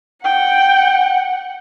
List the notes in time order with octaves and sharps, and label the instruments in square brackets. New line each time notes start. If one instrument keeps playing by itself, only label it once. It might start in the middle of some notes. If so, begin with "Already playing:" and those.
[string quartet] F#5 [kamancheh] G5